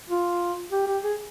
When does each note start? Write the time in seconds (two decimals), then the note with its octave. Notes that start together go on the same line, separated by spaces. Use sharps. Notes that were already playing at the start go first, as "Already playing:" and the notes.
0.10 F4
0.72 G4
0.88 G4
1.04 G#4